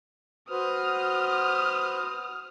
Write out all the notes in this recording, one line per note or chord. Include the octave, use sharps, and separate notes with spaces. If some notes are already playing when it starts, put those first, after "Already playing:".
F#4 B4 C5 D#6 F6